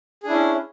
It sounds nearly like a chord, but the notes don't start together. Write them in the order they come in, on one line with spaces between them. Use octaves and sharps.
G#4 D4 E4 C#4